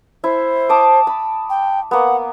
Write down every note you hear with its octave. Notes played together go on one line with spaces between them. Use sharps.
E4 C5
A5 D6 D#6
B5
G5
A#3 B3 F#5